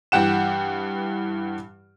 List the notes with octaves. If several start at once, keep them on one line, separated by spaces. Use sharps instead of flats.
G2 E3 G4 F#5 E7